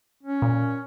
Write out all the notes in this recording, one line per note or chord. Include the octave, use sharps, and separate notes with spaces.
C#4
A#2